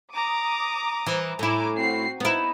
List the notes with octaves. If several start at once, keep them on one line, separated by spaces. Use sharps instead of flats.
A#5 D6 D#6
E3
A2 E4 G#5 A#5 D6
C4 F#4 C7
B3 D#4 E4